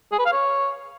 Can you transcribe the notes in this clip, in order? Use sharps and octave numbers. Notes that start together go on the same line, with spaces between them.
G#4
B4
F5
C#5